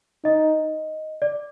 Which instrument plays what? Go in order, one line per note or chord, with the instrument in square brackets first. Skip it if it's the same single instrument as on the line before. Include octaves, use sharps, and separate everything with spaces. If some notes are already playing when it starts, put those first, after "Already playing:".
[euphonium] D#4 [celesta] D#5
[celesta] D5